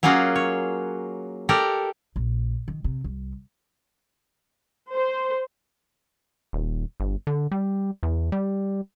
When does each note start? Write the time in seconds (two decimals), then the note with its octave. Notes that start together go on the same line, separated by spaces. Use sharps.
0.03 F#3 A#3 C#4 F4 F#4 G#4
0.36 C#5
1.49 G4 A4 A#4 D5
2.16 A#1
2.68 D#3
2.84 C3
3.04 C2
4.93 C5
6.53 D#1
7.00 G1
7.27 D3
7.51 G3
8.03 E2
8.32 G3